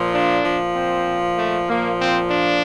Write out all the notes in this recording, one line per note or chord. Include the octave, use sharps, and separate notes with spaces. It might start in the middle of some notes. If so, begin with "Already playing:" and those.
Already playing: A#2 F3
D4
A#2 F3
C4
A3
A#2 F3 A#3
C4
D4